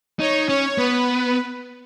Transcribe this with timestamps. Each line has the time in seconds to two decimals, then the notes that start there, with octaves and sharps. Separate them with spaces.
0.19 D#4 C#5
0.49 C#4 C#5
0.78 B3 B4